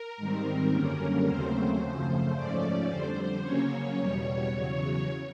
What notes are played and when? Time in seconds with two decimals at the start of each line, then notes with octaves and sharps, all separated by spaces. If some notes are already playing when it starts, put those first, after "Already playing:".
Already playing: A#4
0.17 G#2 D#3 G3 C4
0.72 F#2 D3 G3 A#3 C#4
1.26 D#2 C#3 F#3 A3 C4 C5
1.80 F#2 C#3 F3 A3
2.34 G#2 F3 A3 C#4 D5
2.88 F2 D3 G3 C5
3.43 C#3 F#3 A#3 C#4 C#5
3.98 E2 B2 G3
4.51 E2 C#3 F#3